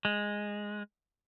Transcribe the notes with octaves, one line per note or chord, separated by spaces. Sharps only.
G#3